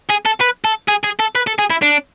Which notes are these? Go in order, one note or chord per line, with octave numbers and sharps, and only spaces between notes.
G#4
A4
B4
A4
G#4
G#4
A4
B4
A4
G#4
E4
D4